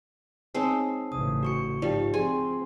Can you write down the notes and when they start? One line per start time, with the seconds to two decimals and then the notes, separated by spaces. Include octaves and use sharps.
0.54 G#3 C4 D#4 C#5 A5 C7
1.12 A1 C#3 D#6
1.43 F#4 C#6 C#7
1.82 G#2 F3 D#4 G4 D5 G5
2.14 F3 C4 G#4 G#5 C6